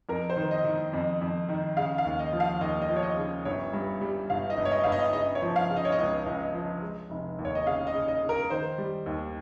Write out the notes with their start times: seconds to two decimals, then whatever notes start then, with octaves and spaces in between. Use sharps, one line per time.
0.09 F2 A#4
0.30 C5
0.36 D#3
0.51 D#5
0.64 D#3
0.93 F2
1.21 F2
1.49 D#3
1.77 C#3 F5
1.98 F5
2.05 D#2
2.19 D#5
2.33 F3
2.40 F5
2.61 D#2 D#5
2.82 D#5
2.89 F3
2.96 C#5
3.03 D#5
3.17 C#3
3.45 G1 C#5
3.73 G2
4.01 G3
4.30 G1 F5
4.50 D#5
4.58 G1
4.65 C#5
4.72 D#5
4.84 G1 F5
4.92 D#5
5.13 C#3 D#5
5.35 C#5
5.42 F3
5.56 F5
5.70 C#3
5.76 D#5
5.85 C#5
5.92 D#5
5.98 C#2
6.26 C#2
6.54 F3
6.82 G#3
7.10 F1
7.39 D#2
7.45 C#5
7.55 D#5
7.66 C#3 F5
7.87 D#5
7.94 C#3
8.08 D#5
8.22 C#3
8.29 A#4
8.50 D#3 C5
8.78 G3
9.06 D#2